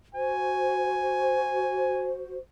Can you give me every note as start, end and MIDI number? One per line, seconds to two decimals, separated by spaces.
0.15 2.37 66
0.15 2.37 72
0.15 2.13 80